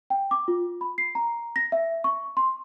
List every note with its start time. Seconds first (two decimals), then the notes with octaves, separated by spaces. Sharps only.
0.10 G5
0.31 D6
0.48 F4
0.81 B5
0.98 C7
1.15 A#5
1.56 A#6
1.72 E5
2.04 C#6
2.37 C6